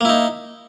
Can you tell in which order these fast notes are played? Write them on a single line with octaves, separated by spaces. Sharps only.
A#3 E4 D#4